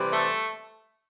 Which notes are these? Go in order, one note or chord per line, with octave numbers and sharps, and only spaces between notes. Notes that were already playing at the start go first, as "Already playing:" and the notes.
Already playing: C3 E3 G3
A3 A4